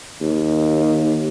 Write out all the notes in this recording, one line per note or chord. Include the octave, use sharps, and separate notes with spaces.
D#2